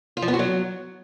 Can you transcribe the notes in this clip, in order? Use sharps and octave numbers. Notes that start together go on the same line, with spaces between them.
F4
F3
B3
F#4
F#3